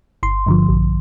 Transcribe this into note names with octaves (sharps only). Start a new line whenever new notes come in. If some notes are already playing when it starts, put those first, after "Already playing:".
G1 C6
G2 D3 F3
A#1